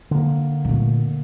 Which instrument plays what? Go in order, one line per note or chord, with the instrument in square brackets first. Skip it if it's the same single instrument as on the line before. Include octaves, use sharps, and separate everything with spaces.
[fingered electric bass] D3 A#3
[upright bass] A#2 A3